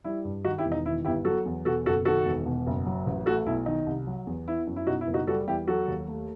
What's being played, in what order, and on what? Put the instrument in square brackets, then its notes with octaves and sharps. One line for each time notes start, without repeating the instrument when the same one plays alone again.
[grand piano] G3 E4
G2
D#3 D#4 F#4
E4 G4
E1
D#4
D#3 E4
G1 E4 G4
F#3 F#4 A4
E2
B2 F#4 A4
F#1 F#4 A4
D#3 F#4 A4
E1
B2
F#1
F#3
A1
A3 F#4 A4
B1 E4
D#3 D#4
C2
F#3
E2
B3 E4
F#2
E4
B2 D#4 F#4
E4
F#1
D#4 F#4
G3 F#4 A4
E2 E4 G4
F#3 F#4 A4
D#2
A3